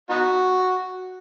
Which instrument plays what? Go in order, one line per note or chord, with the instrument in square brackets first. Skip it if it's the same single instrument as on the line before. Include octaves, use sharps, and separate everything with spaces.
[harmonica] B3 D#4 F#4